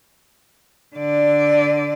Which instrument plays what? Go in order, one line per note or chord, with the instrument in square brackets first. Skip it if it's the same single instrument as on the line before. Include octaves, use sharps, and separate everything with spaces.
[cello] D3 D5